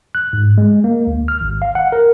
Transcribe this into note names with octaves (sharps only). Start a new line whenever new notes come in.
F#6
G#2
G#3
A#3
D2
F6
G#1
F5
F#5
A#4